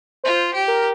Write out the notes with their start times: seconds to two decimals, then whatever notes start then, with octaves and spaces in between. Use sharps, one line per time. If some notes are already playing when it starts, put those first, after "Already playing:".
0.24 F4 C5
0.54 G4
0.68 A#4